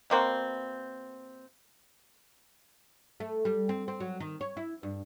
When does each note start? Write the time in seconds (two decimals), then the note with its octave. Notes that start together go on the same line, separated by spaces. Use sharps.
0.10 B2 A#3 C4 F#4
3.20 A3
3.45 G3
3.69 C4
3.88 C4
4.00 F#3
4.20 D#3
4.41 C#5
4.57 E4
4.83 G2